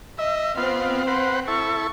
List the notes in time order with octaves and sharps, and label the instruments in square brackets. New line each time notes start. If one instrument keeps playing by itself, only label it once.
[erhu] D#5 [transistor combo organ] E5
[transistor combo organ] B3 F4 [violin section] C4 [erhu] F5
[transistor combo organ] B4 C5 F#5
[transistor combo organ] E4 A4 [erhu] C#6